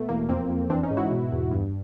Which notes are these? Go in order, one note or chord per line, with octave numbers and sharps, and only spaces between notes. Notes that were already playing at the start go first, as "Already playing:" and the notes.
Already playing: B2 A3
E2 A#3
F2 A#3 C4
F2
E3 C4 D4
C#4 D#4
G#2
E4 F#4
B2
E2
G2